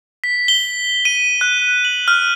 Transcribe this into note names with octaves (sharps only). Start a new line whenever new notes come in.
B6
G7
D#7
F#6
F#7
F6